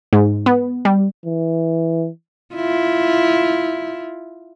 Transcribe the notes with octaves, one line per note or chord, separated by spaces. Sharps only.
G#2
B3
G3
E3
E4 F4